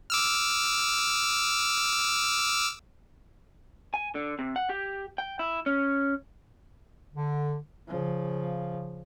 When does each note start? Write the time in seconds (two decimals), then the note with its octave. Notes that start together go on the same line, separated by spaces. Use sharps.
0.10 D6 E6 F6
3.94 G#5
4.15 D3
4.39 C3
4.56 F#5
4.69 G4
5.18 G5
5.39 E4
5.66 C#4
7.14 D3
7.88 C#3 F3